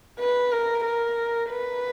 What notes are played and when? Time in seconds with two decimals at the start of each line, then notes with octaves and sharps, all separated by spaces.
0.20 B4
0.52 A#4
0.84 A#4
1.50 B4